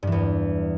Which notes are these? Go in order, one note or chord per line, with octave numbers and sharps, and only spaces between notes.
E2 G2 E3